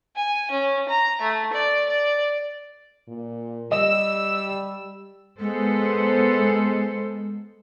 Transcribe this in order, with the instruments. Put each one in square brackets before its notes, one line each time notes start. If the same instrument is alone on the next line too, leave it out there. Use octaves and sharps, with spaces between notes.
[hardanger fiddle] G#5
C#4
A#5
A3
D5
D5
[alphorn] A#2
[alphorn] G3 [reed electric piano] D#5 [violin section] E6
[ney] G#3 [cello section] B3 A4 C5